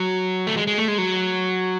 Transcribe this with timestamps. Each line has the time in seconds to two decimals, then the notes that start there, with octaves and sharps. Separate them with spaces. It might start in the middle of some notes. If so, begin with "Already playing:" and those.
Already playing: F#3
0.47 A3
0.57 G#3
0.67 G#3
0.78 A3
0.88 G#3
0.98 F#3